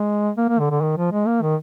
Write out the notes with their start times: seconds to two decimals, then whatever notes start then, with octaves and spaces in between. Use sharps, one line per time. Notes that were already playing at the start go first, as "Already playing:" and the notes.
Already playing: G#3
0.37 A#3
0.49 A#3
0.59 D3
0.70 D3
0.81 D#3
0.97 F3
1.11 G#3
1.27 A#3
1.42 D#3